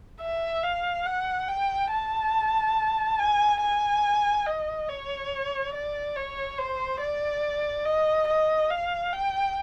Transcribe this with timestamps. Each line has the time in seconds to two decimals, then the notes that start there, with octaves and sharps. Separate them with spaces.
0.21 E5
0.63 F5
1.06 F#5
1.48 G5
1.92 A5
3.19 G#5
3.61 G#5
4.46 D#5
4.89 C#5
5.74 D5
6.16 C#5
6.58 C5
7.01 D5
7.85 D#5
8.28 D#5
8.71 F5
9.13 G5